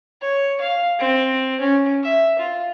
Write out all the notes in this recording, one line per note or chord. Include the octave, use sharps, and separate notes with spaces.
C#5
F5
C4
C#4
E5
F4